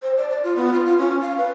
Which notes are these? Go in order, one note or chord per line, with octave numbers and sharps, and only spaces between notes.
C5
D5
D5
F4
B3
F4
F4
C#4
F5
B4